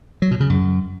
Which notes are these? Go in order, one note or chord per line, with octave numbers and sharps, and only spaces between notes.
F#3
B2
C#3
F#2